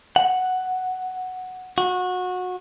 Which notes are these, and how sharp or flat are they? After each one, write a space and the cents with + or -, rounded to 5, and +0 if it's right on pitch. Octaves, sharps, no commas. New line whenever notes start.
F#5 +0
F#4 -25